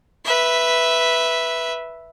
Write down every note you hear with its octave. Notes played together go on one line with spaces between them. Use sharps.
B4 E5